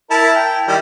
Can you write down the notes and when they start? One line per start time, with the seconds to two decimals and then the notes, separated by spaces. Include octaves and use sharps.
0.10 E4 A#4 A5
0.35 G5
0.68 D#3 G3 E4